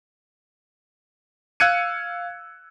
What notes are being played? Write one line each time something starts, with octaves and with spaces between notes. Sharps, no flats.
F5 E6 F#6 G#6 C#7 D#7